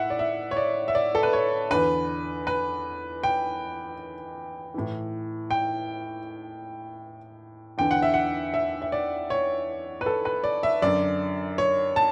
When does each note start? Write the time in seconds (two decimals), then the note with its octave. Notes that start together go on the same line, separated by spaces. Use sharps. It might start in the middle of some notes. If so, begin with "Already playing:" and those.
Already playing: A2 E5 F#5
0.10 D5
0.19 E5
0.51 C#5
0.57 D5
0.88 E5
0.95 D5
1.15 A4
1.23 B4
1.33 C#5
1.70 E2 D3 B4
2.47 B4
3.23 G5
4.74 A2 E3
5.51 G5
7.78 E2 D3 G5
7.91 F#5
8.02 E5
8.14 F#5
8.54 E5
8.82 E5
8.92 D5
9.30 C#5
10.01 B4
10.06 A4
10.25 B4
10.44 D5
10.63 E5
10.82 F#2 D3 D5
11.58 C#5
11.96 A5